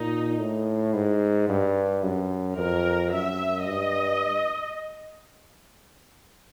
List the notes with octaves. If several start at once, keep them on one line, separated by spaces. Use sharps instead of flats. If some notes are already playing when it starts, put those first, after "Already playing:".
Already playing: A#2 D#4
A2
G#2
G2
F#2
F2 A#4
F#2 E5
G2 D#5